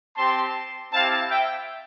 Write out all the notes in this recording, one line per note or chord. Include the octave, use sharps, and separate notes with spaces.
C4 G4 A5 C6
C4 E4 G4 F5 A5
E5 G5